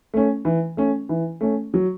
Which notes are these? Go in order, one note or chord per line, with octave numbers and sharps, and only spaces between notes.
A3 C#4
E3
A3 C#4
E3
A3 C#4
F#3